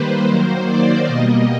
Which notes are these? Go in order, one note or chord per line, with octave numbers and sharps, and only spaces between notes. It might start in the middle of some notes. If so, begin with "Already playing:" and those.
Already playing: D#3 G3 A#3 B4 C5
D#3 F#3 A#3 C5
D5
B2 G3 A#3 D#5